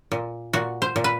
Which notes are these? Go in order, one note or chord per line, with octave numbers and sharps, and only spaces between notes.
A#2
A#2 F#4
C5
A#2
B4